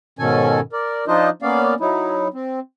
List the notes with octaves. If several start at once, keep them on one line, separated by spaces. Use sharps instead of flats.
G#2 B2 D#3 C#4 A4 G#5
A#4 D5
F3 D4 D#4 F4 C5 D#5
A#3 B3 C#4 D5 F5
F#3 D#4 E4
C4